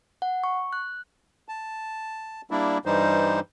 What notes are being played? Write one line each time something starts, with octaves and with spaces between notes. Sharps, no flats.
F#5
C#6
F#6
A5
G3 A#3 D4 E4
G2 E3 G3 D#4 C5